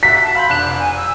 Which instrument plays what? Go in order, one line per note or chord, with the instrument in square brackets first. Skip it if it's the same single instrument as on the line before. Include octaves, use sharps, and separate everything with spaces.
[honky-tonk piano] F#4 E5 A#5 [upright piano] B6
[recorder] A5
[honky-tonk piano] F5 C6 G6 [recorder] B5
[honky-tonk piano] F1 D4 E7 [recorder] F#6
[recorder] G#5
E6